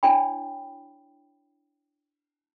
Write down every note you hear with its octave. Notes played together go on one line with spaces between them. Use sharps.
D4 E4 C#5 D5 G5 B5